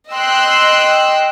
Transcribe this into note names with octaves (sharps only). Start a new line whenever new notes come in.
D#5 G5 C6 E6 F#6